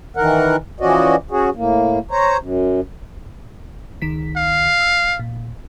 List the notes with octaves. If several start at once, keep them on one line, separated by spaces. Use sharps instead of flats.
D#3 E3 A#4 F#5
E3 F3 C#4 F#4 D5 D#5
C#4 F#4 G#4
A2 A#3
C5 C#5 A#5
F#2
C#2 D#3 B6
F5
E6
A#2